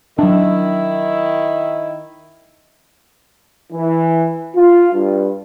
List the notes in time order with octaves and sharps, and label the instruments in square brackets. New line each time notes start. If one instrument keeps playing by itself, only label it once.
[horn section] D#3 E4 [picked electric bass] F#3 D4
[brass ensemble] E3
F4
G2